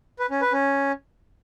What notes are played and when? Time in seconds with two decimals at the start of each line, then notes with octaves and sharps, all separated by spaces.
0.19 B4
0.30 C#4
0.42 B4
0.53 C#4